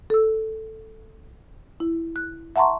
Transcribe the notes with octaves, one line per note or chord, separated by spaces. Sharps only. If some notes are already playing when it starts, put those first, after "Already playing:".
A4 E6
E4
F#6
E5 F#5 A5 A#5 C6 C#6